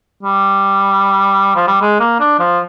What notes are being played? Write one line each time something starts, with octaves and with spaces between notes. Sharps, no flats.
G3
F3
G3
G#3
A#3
D4
F3